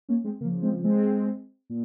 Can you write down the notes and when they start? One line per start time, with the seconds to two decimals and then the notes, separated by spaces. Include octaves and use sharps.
0.09 A#3 C#4
0.24 G#3 C4
0.41 C#3 A#3
0.44 F3
0.62 G#3 C4
0.84 G#3 C4
1.70 A#2